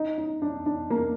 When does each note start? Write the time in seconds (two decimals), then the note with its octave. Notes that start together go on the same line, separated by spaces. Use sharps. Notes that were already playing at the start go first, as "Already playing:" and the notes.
Already playing: D#4
0.18 D#4
0.42 D4
0.66 D4
0.90 A#3